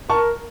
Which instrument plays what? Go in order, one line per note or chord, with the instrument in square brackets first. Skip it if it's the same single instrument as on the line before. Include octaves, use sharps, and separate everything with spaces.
[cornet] A#4 [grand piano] A5 C#6